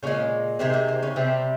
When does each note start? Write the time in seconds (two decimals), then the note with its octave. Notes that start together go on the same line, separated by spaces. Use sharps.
0.03 A#2 C#3 G#3 C#4
0.59 C3 D#3 G#3 C4
0.73 A#3
0.88 C4
1.02 C#3 C#4
1.16 C3 G3 C4